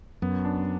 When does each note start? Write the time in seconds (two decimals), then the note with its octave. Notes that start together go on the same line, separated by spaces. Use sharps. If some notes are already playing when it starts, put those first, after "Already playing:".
0.22 F#2 B3
0.45 D4